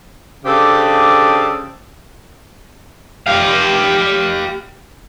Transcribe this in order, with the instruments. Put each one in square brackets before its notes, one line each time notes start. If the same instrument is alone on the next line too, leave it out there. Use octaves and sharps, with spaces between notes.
[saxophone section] C#3 D4 G4 A4 C5
[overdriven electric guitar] G4 F5